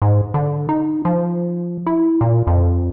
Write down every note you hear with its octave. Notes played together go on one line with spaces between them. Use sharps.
G#2
D3
D#4
F3
E4
A#2
F2